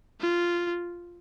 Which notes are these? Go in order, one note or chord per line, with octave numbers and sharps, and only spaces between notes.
F4